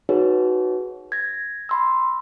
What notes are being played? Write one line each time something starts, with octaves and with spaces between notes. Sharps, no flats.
D#4 F#4 G#4 B4 C#5
G#6 A#6
B5 C6 E6